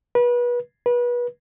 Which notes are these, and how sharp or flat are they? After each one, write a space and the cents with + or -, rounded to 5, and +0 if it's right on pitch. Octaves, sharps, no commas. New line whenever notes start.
B4 -30
B4 -30